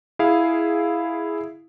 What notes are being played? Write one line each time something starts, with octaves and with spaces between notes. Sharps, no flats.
E4 G#4 F5